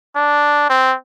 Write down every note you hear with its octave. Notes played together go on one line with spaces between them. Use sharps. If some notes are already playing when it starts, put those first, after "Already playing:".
D4
C4